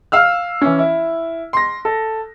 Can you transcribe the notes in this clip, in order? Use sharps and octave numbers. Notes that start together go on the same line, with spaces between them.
F5 E6 F6
E3 C#4
E4
C6 A#6
A4